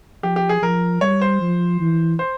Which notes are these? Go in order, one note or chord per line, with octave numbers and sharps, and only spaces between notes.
F3 G4
G4
G#4
F3 A#4
G3 C#5
C5
F3
E3
C5